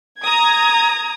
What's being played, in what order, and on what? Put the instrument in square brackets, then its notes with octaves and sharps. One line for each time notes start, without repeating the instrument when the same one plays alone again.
[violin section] A#5 D#6 G#6